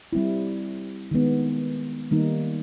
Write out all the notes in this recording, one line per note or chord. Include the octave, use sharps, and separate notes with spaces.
G3 C4 E4
D#3 G#3 B3
D#3 G3 A#3 D#4